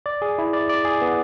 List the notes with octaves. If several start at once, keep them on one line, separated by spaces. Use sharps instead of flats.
D5
G#4
E4
D5
D5
G#4
B3